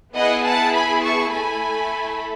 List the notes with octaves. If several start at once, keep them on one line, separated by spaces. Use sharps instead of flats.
B3 E4 G#4 D#5 F#5
F#5 A5
G#5 B5
A5 C#6
A3 E4 A4 G#5 B5